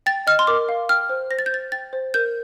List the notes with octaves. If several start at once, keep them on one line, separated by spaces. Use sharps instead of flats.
G5 A6
D#5 F6
C6
A#4 D6
F5
G5 F6
C5
C5 A#6
A6
G6
C5 A6
G5 A6
C5
A#4 G6